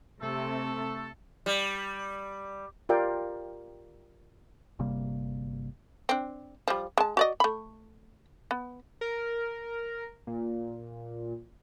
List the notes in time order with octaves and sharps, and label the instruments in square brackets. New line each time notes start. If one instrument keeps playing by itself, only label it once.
[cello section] C3 [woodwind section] A3 A4
[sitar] G3
[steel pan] F4 G4 A#4 D5 F5 G5
[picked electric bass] G1 C3 G3 A#3
[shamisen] C4 D4
F3 G3
G#3 A5
F#4 D5 D#5
A3 B5
B3
[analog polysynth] A#4
A#2